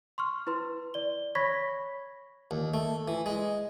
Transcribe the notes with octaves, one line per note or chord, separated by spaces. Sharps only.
C6 C#6 F6
E4 B4 C6
D5 G7
C#5 B5 C#6 G#6 A#6 B6
D#2
A3
E3
G#3